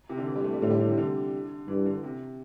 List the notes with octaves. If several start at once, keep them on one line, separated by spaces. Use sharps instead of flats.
C3
D3
E3
G3
A3
G3
A2 D3
G3
D3
C3
D3
G2 E3
D3
C3